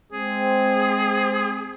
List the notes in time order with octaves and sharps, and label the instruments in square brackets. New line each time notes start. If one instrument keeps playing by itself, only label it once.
[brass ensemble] G#3 C4 [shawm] G#4